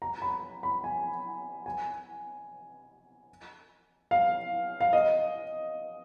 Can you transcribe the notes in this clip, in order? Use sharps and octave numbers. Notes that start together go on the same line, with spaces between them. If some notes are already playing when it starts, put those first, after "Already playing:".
A#5
B5
B5
G#5
G#5
F5
F5
D#5